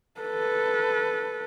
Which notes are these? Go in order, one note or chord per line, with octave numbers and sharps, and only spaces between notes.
A4 B4